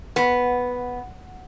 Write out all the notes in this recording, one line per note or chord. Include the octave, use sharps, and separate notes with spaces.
B3